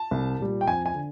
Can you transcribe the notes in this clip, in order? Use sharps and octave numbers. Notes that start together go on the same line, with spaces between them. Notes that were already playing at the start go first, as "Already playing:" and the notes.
Already playing: A5
C2
A#2 G3
G5
F2 G#5
G#5
D3